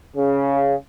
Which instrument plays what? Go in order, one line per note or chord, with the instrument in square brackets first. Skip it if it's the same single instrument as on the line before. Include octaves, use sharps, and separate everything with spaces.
[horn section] C#3